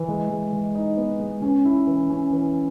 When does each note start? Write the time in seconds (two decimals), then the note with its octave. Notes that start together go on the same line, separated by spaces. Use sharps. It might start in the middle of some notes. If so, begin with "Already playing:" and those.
Already playing: E3
0.08 G#3
0.30 G#3
0.53 G#3
0.75 D#4
0.97 B3
1.20 G#3
1.42 C#4
1.65 E4
1.87 E3
2.10 C#4
2.33 E3